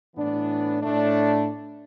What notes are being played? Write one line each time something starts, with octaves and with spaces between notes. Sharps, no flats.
A2 E3 B3 D4
A2 A3 D4